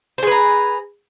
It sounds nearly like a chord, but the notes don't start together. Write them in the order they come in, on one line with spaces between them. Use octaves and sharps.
C5 G#4 B4 A#5